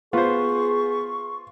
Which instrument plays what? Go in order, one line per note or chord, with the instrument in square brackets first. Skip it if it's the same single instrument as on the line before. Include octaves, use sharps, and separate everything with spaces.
[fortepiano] B3 C5 [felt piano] F4 [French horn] G#4 [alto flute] C#6